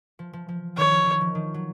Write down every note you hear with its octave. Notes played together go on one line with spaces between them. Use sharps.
F3
F3
F3
D#3 C#5
F3
D#3
F3
D#3
F#3